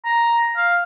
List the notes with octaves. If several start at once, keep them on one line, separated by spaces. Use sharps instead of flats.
A#5
F5